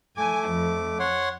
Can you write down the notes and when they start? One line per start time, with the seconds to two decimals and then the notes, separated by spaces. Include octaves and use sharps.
0.17 A3 G#5 D6
0.50 F2
1.00 C#5 F#5 C6